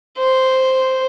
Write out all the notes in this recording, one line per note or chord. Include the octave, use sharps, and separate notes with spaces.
C5